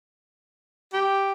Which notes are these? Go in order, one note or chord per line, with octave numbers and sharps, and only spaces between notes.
G4